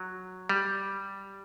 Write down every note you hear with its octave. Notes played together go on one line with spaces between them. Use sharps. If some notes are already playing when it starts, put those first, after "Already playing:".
Already playing: F#3
G3